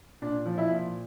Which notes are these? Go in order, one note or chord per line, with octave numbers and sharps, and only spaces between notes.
A#2 D4
F3
E4
A#2